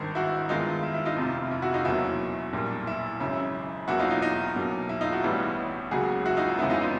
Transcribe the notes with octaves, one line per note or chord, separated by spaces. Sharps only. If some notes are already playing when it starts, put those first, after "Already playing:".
Already playing: G#1 G2 D#3 A#4 C5
E4 F#4
G2 D#3 G#3 B3 D#4 F4
E4
E4
D#4 F4
F1 F2 C3
E4
E4 F#4
D#4 F4
F#1 E2 B2 F#3 A#3 E4
B1 A#2 G3 A#3
E4
G#1 F#2 C#3 E4
E2 B2 F#3 A#3 E4 F#4
D#4 F4
D#4 F4
D#4
B1 B2 F#3 A#3
E4
D#4 F4
E4 F#4
A1 A2 E3 G3 B3
C#2 C#3 F#3 A#3 F#4 G#4
E4 F#4
D#4 F4
E4
F2 C#3 E3 G#3 B3 E4
D#4 F4
D#4 F4